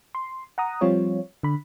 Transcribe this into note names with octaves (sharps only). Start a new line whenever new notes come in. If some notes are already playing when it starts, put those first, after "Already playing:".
C6
F#5 A#5 D#6
F3 G3 C4 F4 C#5
D3 B5